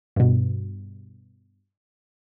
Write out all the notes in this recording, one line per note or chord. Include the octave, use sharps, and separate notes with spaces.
G2 B2